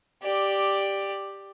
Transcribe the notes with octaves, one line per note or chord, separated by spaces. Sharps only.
G4 D5